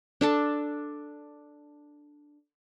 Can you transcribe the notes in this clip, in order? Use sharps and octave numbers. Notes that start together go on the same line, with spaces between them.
D4 A4 A5